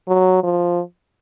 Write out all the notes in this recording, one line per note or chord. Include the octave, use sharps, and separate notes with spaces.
F#3
F3